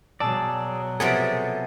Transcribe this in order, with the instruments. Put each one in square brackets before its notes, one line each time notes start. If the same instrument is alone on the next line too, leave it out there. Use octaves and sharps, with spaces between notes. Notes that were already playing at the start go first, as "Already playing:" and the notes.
[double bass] B2 F#3 [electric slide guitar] G#4 D5 [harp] A5 E6
[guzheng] C3 F3 B3 [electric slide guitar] G#4 A4 [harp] C#7 D7